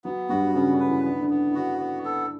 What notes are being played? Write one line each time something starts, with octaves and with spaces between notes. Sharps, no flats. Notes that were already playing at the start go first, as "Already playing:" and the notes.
F#3 B3
G2 G3 F#4
C#3 B3 C#4
D3 D4
B4
E3 E4
B3 D4
E4
D3 D4
B3
E4
D3 D4 F#4
B3
A4